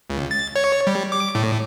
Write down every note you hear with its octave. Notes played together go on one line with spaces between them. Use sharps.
C#2
A6
C#5
G3
D6
A2